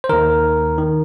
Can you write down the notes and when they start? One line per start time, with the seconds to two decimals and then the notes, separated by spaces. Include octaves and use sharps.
0.04 C5
0.09 D#2 D#3 A#4
0.78 D#3